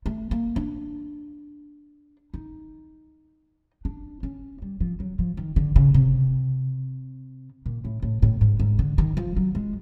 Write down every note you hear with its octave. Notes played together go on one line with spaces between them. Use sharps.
A3
A#3
D4
D#4
D4
C#4
G3
F3
F#3
F3
D#3
D3
C#3
C3
A#2
A2
A2
A2
G#2
G#2
D3
D#3
F3
F#3
G#3